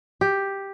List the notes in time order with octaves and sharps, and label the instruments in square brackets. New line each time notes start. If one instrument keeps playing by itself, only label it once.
[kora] G4